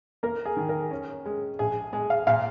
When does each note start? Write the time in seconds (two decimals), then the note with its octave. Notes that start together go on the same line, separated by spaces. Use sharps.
0.23 A#3 A#4
0.45 G#4
0.57 D#3
0.69 A#4
0.91 C#4
1.26 G#3
1.59 A#1 G#4
1.93 G#3 G#4
2.10 F5
2.27 A#2 F5